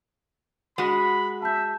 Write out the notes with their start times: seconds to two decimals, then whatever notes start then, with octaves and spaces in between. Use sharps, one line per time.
0.78 G#3 F#4 B5
1.42 E5 A5 G6